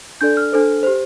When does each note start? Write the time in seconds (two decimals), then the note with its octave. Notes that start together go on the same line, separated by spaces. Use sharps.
0.21 D4 A4 D5 G6
0.37 F6
0.52 D4 A4 C5
0.83 G4 C5